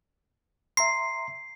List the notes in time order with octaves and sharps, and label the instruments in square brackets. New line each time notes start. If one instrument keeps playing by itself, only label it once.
[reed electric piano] E5 A#5 C6 [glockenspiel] C7